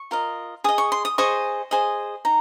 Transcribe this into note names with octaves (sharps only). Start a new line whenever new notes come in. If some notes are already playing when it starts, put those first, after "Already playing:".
Already playing: C#6
F4 A#4 D#5
G#4 D#5 D#6
C#6
C6
D#6
G#4 C5 D#5 C#6
G#4 C5 D#5
D#4 A#5